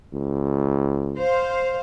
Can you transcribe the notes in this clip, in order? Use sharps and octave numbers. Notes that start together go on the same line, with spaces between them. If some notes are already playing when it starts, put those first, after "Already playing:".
C#2
C5 F5